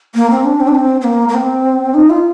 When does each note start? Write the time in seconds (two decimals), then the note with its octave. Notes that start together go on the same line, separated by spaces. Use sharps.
0.15 A#3
0.30 C4
0.44 D4
0.60 C4
0.68 D4
0.75 C4
1.01 C4
1.04 A#3
1.29 A#3
1.34 C4
1.94 D#4
2.10 F4